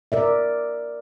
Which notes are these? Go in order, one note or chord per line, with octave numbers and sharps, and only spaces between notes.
A#4 D5 E5